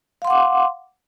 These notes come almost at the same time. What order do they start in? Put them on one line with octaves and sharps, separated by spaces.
F5 C6 F#5 D6